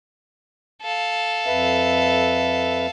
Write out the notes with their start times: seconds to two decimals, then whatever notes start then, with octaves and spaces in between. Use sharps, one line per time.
0.82 A4 F5
1.46 F2 B4 E5